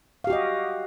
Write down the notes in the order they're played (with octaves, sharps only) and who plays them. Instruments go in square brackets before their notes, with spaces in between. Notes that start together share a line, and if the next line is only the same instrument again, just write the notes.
[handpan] F5
G4
F#4
D#5